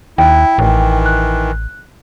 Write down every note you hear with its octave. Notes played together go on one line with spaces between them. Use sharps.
D#2 E4 G5
A1 D#3 E3
F#6